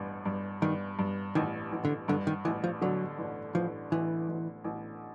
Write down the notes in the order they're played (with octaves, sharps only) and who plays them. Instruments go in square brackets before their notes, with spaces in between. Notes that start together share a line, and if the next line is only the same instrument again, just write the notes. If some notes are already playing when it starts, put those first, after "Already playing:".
Already playing: [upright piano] A1 G2
G2
[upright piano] G2 [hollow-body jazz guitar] D#3
[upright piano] G2
[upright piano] A1 [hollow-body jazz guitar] D#3
[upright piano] A1
[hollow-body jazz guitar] D3
[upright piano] G2 [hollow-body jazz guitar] D3
[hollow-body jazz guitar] D#3
[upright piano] A1 [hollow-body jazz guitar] E3
[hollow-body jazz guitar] F3
[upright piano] D3 [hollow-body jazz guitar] F#3
[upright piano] A1
[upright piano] A1 [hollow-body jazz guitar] F3
[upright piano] A1 [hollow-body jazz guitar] E3
[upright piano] A1
A1